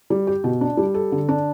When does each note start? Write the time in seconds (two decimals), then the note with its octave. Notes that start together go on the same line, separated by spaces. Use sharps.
0.10 G3
0.27 G4
0.44 B2
0.61 D4
0.77 G3
0.94 A4
1.12 D3
1.29 D4